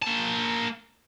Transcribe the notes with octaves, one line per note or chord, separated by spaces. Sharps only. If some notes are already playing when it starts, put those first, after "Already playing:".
A#3 A5